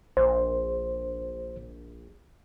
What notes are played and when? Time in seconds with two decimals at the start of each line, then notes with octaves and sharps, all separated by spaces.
0.17 A#1 C5